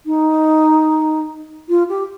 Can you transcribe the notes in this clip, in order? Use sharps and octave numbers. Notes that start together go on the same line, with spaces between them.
D#4
F4
G4